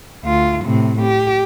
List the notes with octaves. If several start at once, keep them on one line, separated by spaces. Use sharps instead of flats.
D2 F4
A2 C3
G4